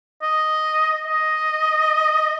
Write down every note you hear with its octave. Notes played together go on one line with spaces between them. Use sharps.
D#5
D#5